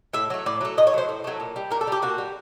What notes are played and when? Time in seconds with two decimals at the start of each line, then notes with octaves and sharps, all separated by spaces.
0.13 A2 E5
0.30 F#3 A3
0.46 A2 D5
0.61 F#3 A3
0.77 A2 D#5
0.87 C#5
0.93 F#3 A3 C5
1.09 A2
1.24 F#3 A3
1.40 A#2
1.56 G3
1.71 A#2 A#4
1.81 A4
1.87 G3 G4
2.02 A#2 F#4
2.18 G3